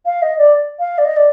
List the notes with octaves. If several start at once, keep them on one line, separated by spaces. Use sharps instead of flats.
F5
D#5
D5
F5
D5
D#5
D5